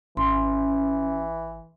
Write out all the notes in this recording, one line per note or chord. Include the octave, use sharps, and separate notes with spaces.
G#1 E3 C#4 C6